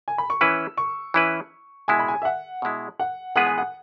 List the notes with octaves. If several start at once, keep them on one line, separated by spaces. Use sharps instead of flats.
G#5
B5
C#6
E3 C#4 E4 B4 E6
C#6
E3 C#4 E4 B4
B2 G#3 E4 G#5
B5
G#5
E5
F#5
B2 G#3 E4
F#5
E3 G#3 B3 G#4 B4 F#5
G#5
F#5